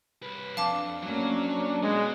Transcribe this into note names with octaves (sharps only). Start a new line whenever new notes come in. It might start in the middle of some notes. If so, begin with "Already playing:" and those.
C2 B4
F2 D4 F5 A5 D6
F2 F#3 A#3 C#4 D4
G#3 B3 F#4